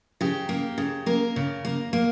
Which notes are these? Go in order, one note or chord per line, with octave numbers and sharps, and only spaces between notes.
C#3 G4
A#3
C#3
A#3 A#4
C#3
A#3
A#3